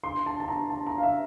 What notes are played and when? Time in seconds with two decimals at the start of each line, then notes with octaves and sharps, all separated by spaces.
0.04 C6
0.26 A5
0.40 A5
0.48 A#5
0.70 A5
0.87 A#5
0.98 F5
1.03 E5